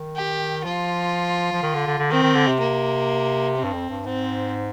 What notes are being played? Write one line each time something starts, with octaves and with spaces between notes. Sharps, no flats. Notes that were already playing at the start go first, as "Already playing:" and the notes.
Already playing: D#3
G4
F3 F4
F3
D#3
D3
D3
D3
D#3 C4
D#3
D3
C3
A#3
C4
G2
F2
G2
G#2 C4